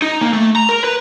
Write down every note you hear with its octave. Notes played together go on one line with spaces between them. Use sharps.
D#4
A#3
A3
A#5
A#4
B4